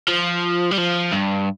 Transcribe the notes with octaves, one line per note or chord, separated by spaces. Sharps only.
F3
G3
F3
G2